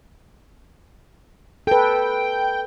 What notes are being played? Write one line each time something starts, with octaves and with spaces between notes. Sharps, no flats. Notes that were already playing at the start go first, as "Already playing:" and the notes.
A4 B4 G5